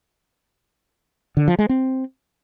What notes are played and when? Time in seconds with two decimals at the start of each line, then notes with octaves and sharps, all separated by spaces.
1.37 D3
1.48 F3
1.59 G#3
1.69 C4